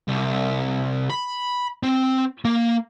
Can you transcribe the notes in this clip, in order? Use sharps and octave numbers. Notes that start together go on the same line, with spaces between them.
C2
B5
C4
A#3